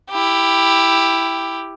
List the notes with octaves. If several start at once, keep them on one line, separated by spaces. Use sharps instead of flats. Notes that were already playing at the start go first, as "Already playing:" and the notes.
E4 G4